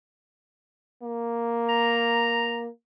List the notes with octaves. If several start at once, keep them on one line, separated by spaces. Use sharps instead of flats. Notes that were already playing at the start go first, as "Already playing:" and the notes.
A#3
A#5